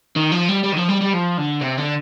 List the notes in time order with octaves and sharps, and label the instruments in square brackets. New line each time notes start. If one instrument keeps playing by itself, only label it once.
[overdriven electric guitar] D#3
F3
G3
G3
D#3
F3
G3
G3
F3
D3
C3
D3